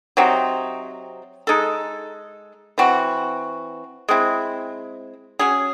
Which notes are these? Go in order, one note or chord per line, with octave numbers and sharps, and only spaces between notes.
C3 F#3 C4 D#4
G#3 D#4 A4
E3 C4 F#4
G#3 C4 E4
F#3 C#4 G#4